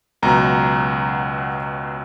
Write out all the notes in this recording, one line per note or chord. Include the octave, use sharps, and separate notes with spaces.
C#2 B2 F#3 A#5